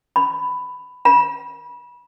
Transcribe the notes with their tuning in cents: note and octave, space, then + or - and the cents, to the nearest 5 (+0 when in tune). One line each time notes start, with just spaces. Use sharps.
B5 +15
B5 -25